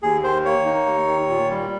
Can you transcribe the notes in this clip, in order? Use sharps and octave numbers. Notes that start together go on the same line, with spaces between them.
D#2 G#4
D#3 C5
A#3 C#5
D#4
D#2
D#3
A#2
G3